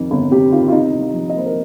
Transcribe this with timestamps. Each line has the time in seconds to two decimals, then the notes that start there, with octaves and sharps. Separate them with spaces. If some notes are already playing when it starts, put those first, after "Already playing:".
Already playing: F2 C3 D#3
0.11 G1
0.31 C3 G4
0.52 D#3 F4
0.68 F4
0.72 C3 D#4
0.93 C2
1.13 F3
1.30 D#5
1.34 A#3 C5
1.46 A#4